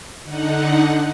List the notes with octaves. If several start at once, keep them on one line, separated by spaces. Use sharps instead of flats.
D3 D#4 F#5